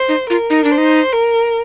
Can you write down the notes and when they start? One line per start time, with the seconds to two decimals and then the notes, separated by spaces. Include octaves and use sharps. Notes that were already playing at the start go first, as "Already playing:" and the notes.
Already playing: C5
0.08 D#4
0.29 F4 A#4
0.50 D#4
0.64 D4
0.71 C5
0.78 D#4
1.13 A#4